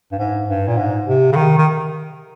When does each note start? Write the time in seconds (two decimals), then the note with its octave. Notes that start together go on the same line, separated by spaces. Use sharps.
0.12 G2
0.19 G#2
0.49 G2
0.68 A#2
0.77 G#2
1.07 C3
1.32 C#3
1.36 D#3
1.58 D#3